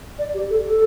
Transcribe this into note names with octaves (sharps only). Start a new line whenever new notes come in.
D5
G4
A4
A4